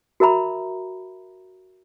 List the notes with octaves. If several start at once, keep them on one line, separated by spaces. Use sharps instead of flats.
F#4 A#4 E5 A#5 B5